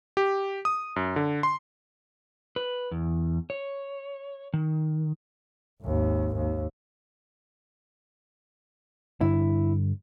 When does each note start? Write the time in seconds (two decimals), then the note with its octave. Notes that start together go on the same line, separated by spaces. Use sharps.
0.17 G4
0.65 D#6
0.96 F#2
1.16 D3
1.43 C6
2.56 B4
2.91 E2
3.50 C#5
4.54 D#3
5.82 G#1 D#2
6.36 D#2
9.21 G2 D3 E4